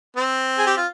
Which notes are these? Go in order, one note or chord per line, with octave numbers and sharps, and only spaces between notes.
C4
G#4
G4
F4